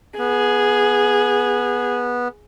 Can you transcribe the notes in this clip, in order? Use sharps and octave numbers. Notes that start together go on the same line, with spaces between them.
B3 G#4